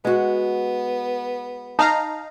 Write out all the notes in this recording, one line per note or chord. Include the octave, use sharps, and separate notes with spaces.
G#3 B3 F#4
D#4 F5 A5 A#5